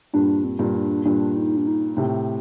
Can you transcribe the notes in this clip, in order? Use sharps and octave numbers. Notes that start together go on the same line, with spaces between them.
G2 A#2 D4
C4
G2 A#2
D4
G2 A#2 D4
D#4
D4
D#4
A2 C3